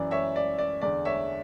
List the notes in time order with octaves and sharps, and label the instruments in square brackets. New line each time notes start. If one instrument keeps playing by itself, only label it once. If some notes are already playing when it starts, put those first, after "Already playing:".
Already playing: [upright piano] F#2 E3 D5
C#5 E5
D5
D5
E2 D3 D5
C#5 E5